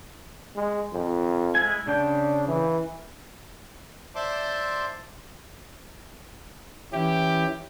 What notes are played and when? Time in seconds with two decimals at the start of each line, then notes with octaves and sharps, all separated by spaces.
0.56 G#3
0.93 F2
1.55 G#3 E4 G#5
1.87 C#3 D4 G5
2.48 E3
4.15 C5 D5 E5 A5 C6 D6
6.93 E3 C#4 E4 G4